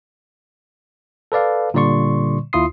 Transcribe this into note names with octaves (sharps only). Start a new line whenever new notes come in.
A4 B4 D5 F5
A#2 D3 G3 D5 C6 C#6
D#2 E4 F4 C6 D#6 C7